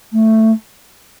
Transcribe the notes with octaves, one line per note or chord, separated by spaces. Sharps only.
A3